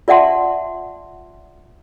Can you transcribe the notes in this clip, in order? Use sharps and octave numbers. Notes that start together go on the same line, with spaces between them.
F4 D5 E5 F#5 A5 C6